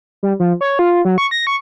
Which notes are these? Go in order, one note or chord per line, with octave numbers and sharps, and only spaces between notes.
G3
F3
C#5
F4
F#3
C#6
A#6
C#6